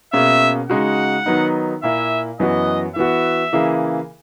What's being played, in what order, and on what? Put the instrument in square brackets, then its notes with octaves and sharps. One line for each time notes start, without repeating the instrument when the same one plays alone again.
[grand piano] B2 A#3 C#4 G#4 [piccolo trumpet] E5
[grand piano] C#3 G#3 D#4 F#4 [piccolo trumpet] F#5
[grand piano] D#3 F#3 B3 D#4
[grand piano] A#2 A#3 E4 [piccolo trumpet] E5
[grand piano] F#2 E3 B3 F#4 [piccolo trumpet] D#5
[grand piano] E3 B3 F#4 [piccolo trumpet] E5
[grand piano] C#3 E3 A#3 E4 G#4